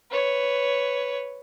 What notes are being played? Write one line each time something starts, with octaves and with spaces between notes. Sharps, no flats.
B4 C#5